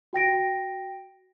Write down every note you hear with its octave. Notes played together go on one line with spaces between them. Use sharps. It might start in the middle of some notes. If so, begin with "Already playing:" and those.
F#4 G5 A#6 D7